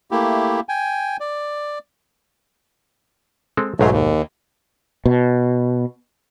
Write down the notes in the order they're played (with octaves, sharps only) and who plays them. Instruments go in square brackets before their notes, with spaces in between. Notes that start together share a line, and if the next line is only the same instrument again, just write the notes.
[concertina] A3 A#3 E4 G4
G5 G#5
D5
[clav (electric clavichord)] G#3 C4 A4
[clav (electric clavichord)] B1 G#2 F5 [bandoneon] F#3 G#3 A3
[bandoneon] D#2
[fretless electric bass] B2